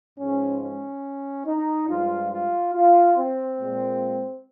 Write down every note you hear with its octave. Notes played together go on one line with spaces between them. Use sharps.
G#2 F3 G#3 C#4
C#4
D#4
G2 F3 G#3 F4
F4
F4
C4
A#2 G#3